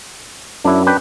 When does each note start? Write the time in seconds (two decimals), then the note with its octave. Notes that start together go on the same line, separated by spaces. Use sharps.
0.64 F#2 D4 E4
0.87 D4 B4 G5